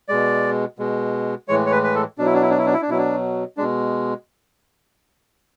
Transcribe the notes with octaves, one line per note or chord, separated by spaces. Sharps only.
B2 G#3 D5
B2 G#3
A2 E3 G#3 C#5
C#5
B4
B4
A4
B2 F#3 D4
E4
D4
E4
D4
E4
D4
E4
D4
B2 F#3 E4
D4
B2 G#3 D4